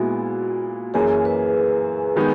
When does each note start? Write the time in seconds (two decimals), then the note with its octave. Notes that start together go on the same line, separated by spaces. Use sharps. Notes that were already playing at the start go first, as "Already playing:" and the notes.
Already playing: A#2 G#3 B3 E4 F#4
0.94 F#2 E3 A#3 C#4 G#4
1.25 B4
2.16 D#3 G#3 B3 D#4